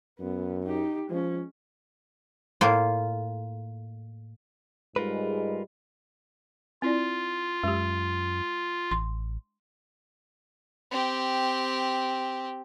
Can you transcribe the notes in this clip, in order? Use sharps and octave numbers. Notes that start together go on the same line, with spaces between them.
F#2 B3
D#4 G4
F3 G#3 C#4
A2 A#3 F4
G#2 G3 G#3 F4 A#4 B4
C4 E4 F4 D5
F#2 G#3 G4
A1 C6
C4 G4